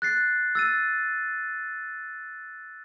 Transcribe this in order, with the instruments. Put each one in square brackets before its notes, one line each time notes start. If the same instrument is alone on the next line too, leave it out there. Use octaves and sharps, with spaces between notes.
[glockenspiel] F#6 A6 C7
E6 A6 D#7